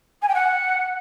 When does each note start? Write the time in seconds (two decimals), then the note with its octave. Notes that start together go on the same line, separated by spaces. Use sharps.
0.22 G#5
0.28 G5
0.34 F#5